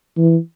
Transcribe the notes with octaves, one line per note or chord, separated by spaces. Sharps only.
E3